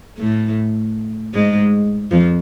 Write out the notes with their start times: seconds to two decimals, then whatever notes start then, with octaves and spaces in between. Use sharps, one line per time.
0.18 A2 A3
1.34 G#2 G#3
2.11 F2 F3